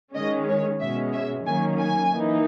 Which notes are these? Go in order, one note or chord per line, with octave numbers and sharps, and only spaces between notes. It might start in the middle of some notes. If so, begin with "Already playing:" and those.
D#3 G#3 C#4 D#5
C#5
B2 G#3 C#4 E5
E5
D#3 F#3 A#3 C#4 G#5
G#5
E3 A#3 D#4